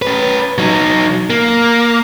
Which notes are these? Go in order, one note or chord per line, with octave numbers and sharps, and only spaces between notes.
C#4 B4
F#3 D#4
A#3